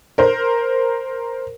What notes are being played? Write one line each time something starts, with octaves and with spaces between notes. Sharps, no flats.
A#4 C5